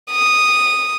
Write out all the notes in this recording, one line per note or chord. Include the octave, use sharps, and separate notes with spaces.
D#6